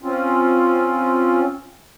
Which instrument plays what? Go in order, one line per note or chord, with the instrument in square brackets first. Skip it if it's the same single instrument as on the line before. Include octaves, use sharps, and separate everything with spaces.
[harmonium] C4 C#4 F4